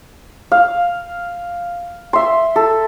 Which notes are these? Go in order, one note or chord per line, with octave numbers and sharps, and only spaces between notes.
F5
E5 C6
A4